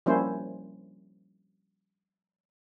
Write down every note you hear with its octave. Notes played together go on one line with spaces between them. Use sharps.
F3 G3 A#3 C#4 E4 C5